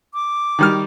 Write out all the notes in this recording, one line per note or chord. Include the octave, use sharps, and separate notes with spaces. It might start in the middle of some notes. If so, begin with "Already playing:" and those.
D6
D#3 G3 F6